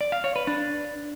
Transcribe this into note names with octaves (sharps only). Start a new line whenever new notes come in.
D5
F5
C#5
B4
D4